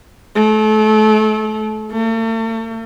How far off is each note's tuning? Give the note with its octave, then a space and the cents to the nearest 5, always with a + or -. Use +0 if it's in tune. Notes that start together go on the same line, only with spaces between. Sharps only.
A3 -30
A3 +40